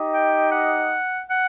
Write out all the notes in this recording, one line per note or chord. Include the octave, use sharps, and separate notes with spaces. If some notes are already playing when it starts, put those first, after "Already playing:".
Already playing: D#4 G4 D#5
G5
F#5
F#5